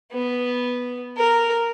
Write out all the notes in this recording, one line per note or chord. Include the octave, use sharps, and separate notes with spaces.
B3
A#4